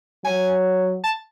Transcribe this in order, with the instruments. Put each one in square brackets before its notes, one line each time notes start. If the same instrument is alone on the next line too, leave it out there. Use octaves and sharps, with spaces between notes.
[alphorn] F#3 [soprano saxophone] G#5
[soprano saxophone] A5